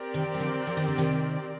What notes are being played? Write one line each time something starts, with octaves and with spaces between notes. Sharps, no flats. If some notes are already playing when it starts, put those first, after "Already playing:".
Already playing: C4 G4 A#4 D5
C3 D#3
G3
D3 F3
F3
D#3
D3
C3 D#3